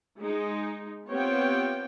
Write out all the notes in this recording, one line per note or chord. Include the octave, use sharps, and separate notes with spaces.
G#3 D#4
B3 C4 F4 G4 C#5 G5